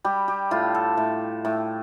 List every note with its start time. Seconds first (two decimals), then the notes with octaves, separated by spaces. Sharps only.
0.04 G3 G4
0.28 G4
0.51 A2 F4
0.75 A4
0.97 A2
1.45 A2